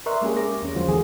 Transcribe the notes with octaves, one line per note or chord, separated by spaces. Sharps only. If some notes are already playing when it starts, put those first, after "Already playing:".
A#4 D5 E5 C6 C#6 F#6
G#3 A#3 C#4 G4 G#4
D6 A#6
E2 C#4
D3 F3 G#3 F4 F#4 C5
E2 E3 F3 A3 G#4